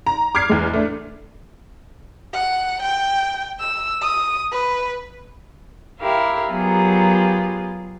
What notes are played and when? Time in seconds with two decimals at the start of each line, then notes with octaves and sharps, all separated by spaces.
0.06 A#5
0.35 D6 F6 G#6 C7
0.49 E2 G#3
0.74 A3 D4
2.33 F#5
2.82 G5
3.59 E6
4.01 D#6
4.52 B4
6.00 E4 G4 A#4 E5 F5
6.50 F#3 B3 F4 G4 G#4 A#4